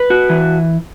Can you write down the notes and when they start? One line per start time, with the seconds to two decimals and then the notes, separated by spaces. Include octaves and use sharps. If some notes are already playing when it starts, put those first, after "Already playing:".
Already playing: B4
0.10 F#4
0.30 E3